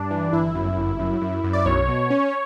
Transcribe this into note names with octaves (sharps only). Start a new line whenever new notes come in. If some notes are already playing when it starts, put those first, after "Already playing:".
Already playing: G2 D4
E3
G1 E4
F#2
G1
F#2
F#2
F#2
D5
B1 C#5
B2
C#4